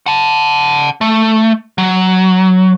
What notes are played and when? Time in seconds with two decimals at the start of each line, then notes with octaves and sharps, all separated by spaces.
0.06 F#5 A5
1.01 A3
1.78 F#3